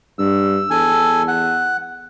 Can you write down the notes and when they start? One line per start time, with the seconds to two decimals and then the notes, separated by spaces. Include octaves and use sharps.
0.19 G2 E6
0.70 E2 A4 G#5
1.28 F#5